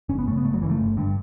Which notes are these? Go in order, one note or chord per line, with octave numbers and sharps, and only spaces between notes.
F#1 C#4
B3
F#2 C#3 A3
B3
F#1 A3
F#3
F#2 C#3 E3
A3
G1
G2 D3